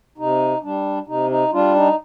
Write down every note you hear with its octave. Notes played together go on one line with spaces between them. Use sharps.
C3 D#4
G3 D4
C3 D#4
D#4
G3 D4 F4
D#4